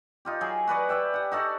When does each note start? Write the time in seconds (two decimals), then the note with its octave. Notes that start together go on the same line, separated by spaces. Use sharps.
0.25 D#4 F4 G4
0.41 F#3 G#4
0.67 F#4 B4 D5 F#5
0.89 G4 D5 E5 G5
1.14 G4 F#5
1.32 D#4 F#4 A4 D5